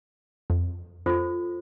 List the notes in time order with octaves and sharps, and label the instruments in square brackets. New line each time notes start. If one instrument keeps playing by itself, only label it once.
[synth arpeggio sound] F2
[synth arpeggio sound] F2 [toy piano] F4 A4 C5